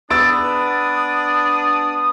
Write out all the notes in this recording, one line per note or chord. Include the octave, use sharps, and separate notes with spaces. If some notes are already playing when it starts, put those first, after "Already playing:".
B3 D4 D#6 E6 A6 D7